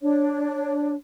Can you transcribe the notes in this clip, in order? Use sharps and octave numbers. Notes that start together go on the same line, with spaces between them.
D4 C#5